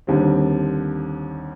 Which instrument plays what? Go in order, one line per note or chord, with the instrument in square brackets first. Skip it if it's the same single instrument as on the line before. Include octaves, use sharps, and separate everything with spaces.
[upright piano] D#2 D3 G3 C4